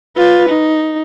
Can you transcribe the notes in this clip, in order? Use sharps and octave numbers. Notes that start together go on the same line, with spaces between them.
F4 B4
D#4